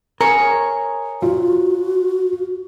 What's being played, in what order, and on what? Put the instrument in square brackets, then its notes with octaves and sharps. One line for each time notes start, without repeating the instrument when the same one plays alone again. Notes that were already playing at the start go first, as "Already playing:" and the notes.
[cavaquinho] G#4 C#5 [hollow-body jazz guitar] A#4
[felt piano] F4 [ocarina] F#4